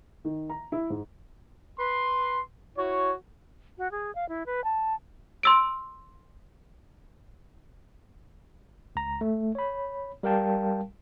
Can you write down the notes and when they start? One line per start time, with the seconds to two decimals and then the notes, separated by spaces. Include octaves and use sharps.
0.25 D#3
0.49 A#5
0.72 E4
0.90 G#2
1.79 B4 C6
2.76 E4 F#4 C#5
3.78 F#4
3.91 G#4
4.15 F5
4.29 E4
4.46 B4
4.64 A5
5.43 C6 E6 D7
8.96 C#2 A#5
9.21 A3
9.55 C#5 B5
10.23 G3 A#4 F5 G5 A5